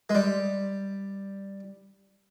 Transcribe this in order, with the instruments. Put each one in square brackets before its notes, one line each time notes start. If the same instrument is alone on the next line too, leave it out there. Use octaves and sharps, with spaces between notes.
[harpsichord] G#3
G3